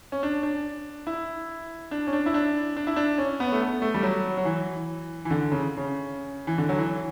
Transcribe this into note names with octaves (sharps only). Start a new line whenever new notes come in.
C#4
D4
D4
E4
D4
C#4
D4
E4
D4
D4
E4
D4
C#4
B3
A3
B3
A3
G3
F#3
F#3
E3
E3
D3
C#3
C#3
E3
D3
F#3
E3